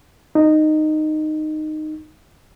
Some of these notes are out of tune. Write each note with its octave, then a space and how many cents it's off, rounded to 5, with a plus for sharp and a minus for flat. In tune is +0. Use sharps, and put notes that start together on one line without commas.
D#4 -15